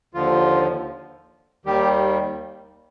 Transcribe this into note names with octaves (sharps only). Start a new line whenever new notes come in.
D#2 D3 F3 F4
D#2 D#3 G3 G4